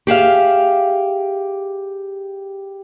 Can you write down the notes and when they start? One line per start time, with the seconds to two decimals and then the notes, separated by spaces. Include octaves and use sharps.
0.07 G4 G#4 E5 F5